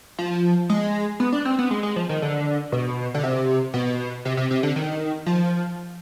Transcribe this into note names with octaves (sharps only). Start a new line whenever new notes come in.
F3
G#3
B3
D4
C4
B3
G#3
G#3
F3
D#3
D3
B2
D3
C3
B2
C3
C3
C3
D3
D#3
F3